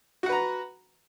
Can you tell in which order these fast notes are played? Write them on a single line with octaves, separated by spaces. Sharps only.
F#4 F#5 B4 A#5